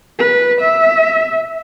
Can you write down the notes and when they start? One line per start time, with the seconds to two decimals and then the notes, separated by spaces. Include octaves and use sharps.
0.19 B4
0.60 E5